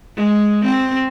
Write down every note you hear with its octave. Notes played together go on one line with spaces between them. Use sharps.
G#3
C4